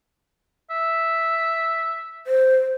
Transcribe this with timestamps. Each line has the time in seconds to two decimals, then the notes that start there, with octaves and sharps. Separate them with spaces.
0.71 E5
2.27 C5